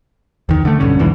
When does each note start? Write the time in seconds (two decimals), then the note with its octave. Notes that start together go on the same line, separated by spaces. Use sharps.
0.49 E2 D#3
0.65 D3 A3
0.80 B1 G2 D3 C#4
0.99 B1 E2 G#2 E3